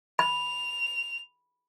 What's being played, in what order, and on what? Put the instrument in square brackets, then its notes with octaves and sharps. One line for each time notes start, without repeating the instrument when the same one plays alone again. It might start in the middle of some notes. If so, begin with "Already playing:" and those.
[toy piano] B5 [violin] F7